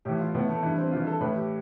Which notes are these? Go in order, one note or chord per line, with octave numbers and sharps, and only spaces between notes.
A2 E3 G4
F4
A2 E3 B3
A3
G2 E3
C4
G2 E3 F4
A4
A2 E3 B4
G4